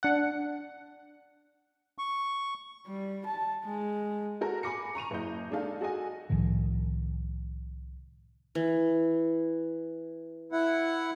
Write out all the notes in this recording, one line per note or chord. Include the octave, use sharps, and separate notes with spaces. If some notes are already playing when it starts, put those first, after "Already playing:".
D4 F#5
C#6
G3
A5
G#3
F#4 A4 A#4
G#5 B5 D6 A#6 C#7
A#5 C#6 D#7 F7
F#1 E4 D#5 G6
G#3 D4 D#4 A4 F5
F#4 A4 D#5 G#5
C2 A2 D#3 F3
E3
E4 F#5